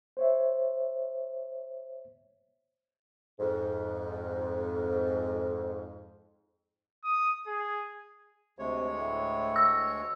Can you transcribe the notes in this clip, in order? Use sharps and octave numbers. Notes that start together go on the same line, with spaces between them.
C5 C#5 E5
F2 G#2
D#6
G#4
D2 C3 G#3 C#5
A2
E6